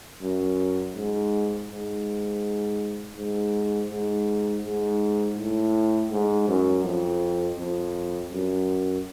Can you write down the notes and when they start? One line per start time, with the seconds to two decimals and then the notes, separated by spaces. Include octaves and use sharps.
0.22 F#2
0.95 G#2
1.69 G#2
3.16 G#2
3.90 G#2
4.64 G#2
5.37 A2
6.11 G#2
6.48 F#2
6.84 F2
7.58 F2
8.32 F#2